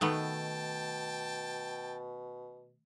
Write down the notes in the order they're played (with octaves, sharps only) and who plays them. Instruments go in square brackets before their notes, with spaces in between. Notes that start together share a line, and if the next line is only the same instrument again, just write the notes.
[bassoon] B2 [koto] D#3 A3 B3 [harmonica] G5 A5